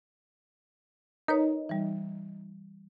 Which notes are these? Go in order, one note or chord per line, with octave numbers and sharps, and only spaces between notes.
D#4 A#4 B4 C#5
E3 G3